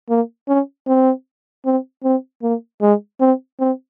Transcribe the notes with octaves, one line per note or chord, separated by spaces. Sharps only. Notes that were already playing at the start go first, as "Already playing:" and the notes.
A#3
C#4
C4
C4
C4
A#3
G#3
C4
C4